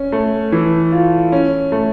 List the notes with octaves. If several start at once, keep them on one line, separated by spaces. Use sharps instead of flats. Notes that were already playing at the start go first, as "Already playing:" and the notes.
Already playing: C#4
A3
E3
F4
C#4
A3